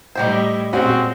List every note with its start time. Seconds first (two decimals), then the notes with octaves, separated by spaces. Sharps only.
0.15 A2 G3 D#4 E4 G4 C5
0.73 A#2 G#3 C4 C#4 F#4 F#5